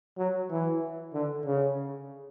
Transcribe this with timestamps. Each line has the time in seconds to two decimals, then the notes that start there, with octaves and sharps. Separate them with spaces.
0.18 F#3
0.50 E3
1.14 D3
1.46 C#3